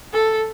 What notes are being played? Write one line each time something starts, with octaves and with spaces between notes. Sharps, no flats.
A4